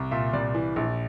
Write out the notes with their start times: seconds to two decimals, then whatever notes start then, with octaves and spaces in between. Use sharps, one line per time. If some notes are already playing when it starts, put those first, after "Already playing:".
Already playing: C2
0.11 A#2 E5
0.33 C2 D5
0.54 E3
0.76 A#1